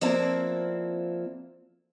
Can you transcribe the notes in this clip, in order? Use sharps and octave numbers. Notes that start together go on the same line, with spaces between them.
F3 A#3 C4 D4 E4 A4